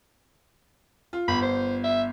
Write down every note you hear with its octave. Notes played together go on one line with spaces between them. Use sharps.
F4
G1 B5
C5
E5